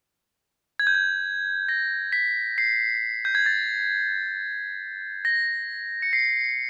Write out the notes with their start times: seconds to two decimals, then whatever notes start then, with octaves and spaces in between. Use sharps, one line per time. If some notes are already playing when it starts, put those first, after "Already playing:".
0.79 G#6
0.87 G6
0.95 G#6
1.69 A#6
2.12 B6
2.58 C7
3.25 G6
3.35 G#6
3.46 A6
5.25 A#6
6.02 C#7
6.13 C7